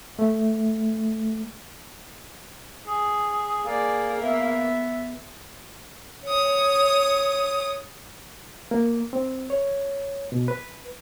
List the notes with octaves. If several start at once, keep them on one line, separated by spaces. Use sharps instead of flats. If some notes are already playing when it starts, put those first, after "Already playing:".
A3
G#4
A#3 G#4 D5
B3 E5
C#5 D#6
A#3
C4
C#5
B2
B4